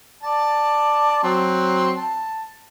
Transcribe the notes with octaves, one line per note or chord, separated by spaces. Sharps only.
D5 A5
F#3 C4
A5